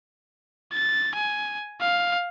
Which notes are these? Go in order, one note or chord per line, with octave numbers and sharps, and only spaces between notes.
A6
G#5
F5